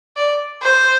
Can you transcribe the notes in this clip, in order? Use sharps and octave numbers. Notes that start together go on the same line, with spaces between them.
D5
C5